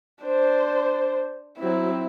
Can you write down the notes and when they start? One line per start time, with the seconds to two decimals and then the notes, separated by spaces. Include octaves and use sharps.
0.23 D4 C5
1.58 F#3 C4 E4